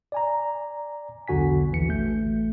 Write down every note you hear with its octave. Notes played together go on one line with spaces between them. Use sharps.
D5 G#5 A#5
B1 E2 D3 F#4 G#5 B6
G#1 D#2 E3 C#7
A1 A3 G6